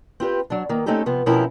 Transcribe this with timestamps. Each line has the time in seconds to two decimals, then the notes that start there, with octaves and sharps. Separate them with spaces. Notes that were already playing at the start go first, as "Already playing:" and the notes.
0.20 C4 F4 G4 B4
0.50 F#3 D4
0.69 D#3 A#3
0.86 A3 C4 C#4 D#4 G4 A4
1.06 C3 F3 B3
1.26 B2 F3 C4 C#4 E4 A#4